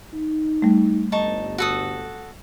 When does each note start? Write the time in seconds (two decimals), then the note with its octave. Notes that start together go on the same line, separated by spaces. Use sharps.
0.14 D#4
0.62 G3 A3
1.12 G1 D#4 A5 C#6
1.58 F#4 A4 D#6